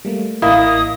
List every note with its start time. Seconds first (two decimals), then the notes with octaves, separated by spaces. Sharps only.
0.05 G3 A3 A#3
0.42 A1 A#3 E4 D#5 D#6